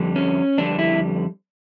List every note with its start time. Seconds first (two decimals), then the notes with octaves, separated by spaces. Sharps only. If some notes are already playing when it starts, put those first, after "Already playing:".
Already playing: F2 D3 G3
0.16 C#4
0.58 F2 D3 G3 D4
0.79 E4